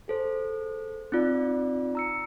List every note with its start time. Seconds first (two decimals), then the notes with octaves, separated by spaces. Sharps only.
0.08 G#4 A4 C5
1.12 C4 D#4 F4 D5
1.95 A#5 E6 C#7